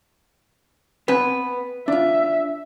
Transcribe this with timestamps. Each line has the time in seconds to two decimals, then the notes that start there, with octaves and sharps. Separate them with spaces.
1.08 B3 C4 B4 G#5
1.88 D4 F4 E5